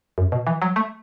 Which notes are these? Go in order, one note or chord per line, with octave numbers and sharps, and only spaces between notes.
F#2
B2
E3
F#3
A3